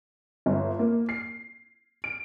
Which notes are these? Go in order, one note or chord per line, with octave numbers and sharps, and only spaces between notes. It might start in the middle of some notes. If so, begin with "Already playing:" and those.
G1
A#3
C7
D7